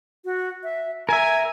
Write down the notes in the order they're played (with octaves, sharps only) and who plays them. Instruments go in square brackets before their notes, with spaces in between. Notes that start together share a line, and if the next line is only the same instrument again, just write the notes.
[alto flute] F#4
E5
[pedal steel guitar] A#4 E5 [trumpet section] G#5 [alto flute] A#5